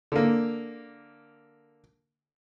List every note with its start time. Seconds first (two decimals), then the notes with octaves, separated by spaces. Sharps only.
0.12 D3 A#3